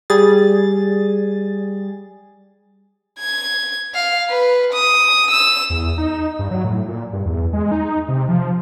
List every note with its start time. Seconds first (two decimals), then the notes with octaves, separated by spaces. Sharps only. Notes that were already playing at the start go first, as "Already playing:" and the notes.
0.10 G3 G#4 A6
3.19 G#6
3.94 F5
4.29 B4
4.73 D#6
5.31 E6
5.70 E2
5.98 D#4
6.39 G2
6.51 F#3
6.65 A2
6.88 A#2
7.13 G2
7.26 E2
7.53 G#3
7.72 D#4
8.08 C3
8.29 F3